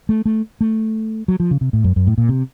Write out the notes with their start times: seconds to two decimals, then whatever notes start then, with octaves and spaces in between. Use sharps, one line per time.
0.09 A3
0.26 A3
0.61 A3
1.28 F#3
1.40 F3
1.51 C#3
1.61 C3
1.73 A2
1.84 F#2
1.96 F#2
2.07 A2
2.18 A#2
2.29 C3